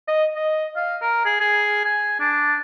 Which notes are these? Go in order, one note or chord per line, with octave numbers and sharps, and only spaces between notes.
D#5
D#5
F5
A#4
G#4
G#4
G#5
D4